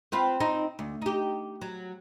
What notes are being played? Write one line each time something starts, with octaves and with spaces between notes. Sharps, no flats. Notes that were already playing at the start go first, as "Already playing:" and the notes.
C4 F4 B4
C4 D#4
D2
D#4 G4
F#3